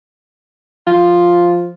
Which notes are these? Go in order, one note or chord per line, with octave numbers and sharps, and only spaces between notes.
F3 F4